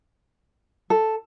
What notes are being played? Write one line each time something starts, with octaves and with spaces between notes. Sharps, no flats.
A4